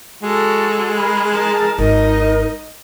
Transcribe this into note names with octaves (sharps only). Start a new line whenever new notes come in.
G#3 F#4 A4
G#4 A#4 B5
G#4 A#4 A5
G#1 D#4 A#4 D#5